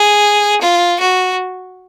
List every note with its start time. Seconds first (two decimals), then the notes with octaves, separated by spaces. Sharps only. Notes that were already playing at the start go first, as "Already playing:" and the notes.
Already playing: G#4
0.61 F4
0.99 F#4